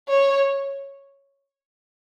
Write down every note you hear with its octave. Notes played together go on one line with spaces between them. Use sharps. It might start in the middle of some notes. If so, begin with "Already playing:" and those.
C#5